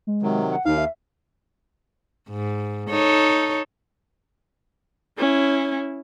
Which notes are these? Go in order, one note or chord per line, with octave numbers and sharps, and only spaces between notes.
G#3
C3 D#3 F#3
F#5
D#2 D#4 F5
E5
G#2
D#4 A4 C#5
C#4 E4